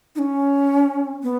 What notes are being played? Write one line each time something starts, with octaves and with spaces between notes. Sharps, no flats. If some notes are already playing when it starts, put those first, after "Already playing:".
D#4
C#4
B3